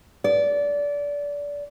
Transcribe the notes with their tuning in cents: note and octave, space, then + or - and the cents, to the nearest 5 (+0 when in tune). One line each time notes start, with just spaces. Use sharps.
D5 -25